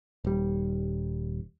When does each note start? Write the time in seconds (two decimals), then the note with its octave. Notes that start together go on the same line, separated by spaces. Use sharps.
0.24 D#1 G3